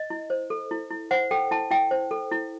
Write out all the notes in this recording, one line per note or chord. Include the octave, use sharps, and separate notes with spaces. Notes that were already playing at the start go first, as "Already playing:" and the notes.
Already playing: D#5
E4
C5
A4
E4
E4
C5 F#5
A4 G5
E4 A5
E4 G5
C5
A4
E4